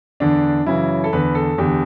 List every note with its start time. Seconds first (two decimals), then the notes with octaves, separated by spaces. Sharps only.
0.20 E2 D3 D4
0.66 F#2 C#3 E3 E4
1.04 A4
1.13 E2 D3 B4
1.35 A4
1.58 E2 D3 G4